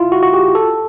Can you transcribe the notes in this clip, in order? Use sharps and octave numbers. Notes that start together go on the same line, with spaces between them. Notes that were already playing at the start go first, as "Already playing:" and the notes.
Already playing: E4 F4
F#4
F#4
G4
A4